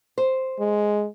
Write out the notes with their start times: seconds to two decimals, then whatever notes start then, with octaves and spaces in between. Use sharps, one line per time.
0.18 C5
0.59 G#3